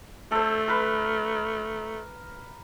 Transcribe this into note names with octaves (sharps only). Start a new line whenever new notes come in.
A3 A4 C5
A#4 B4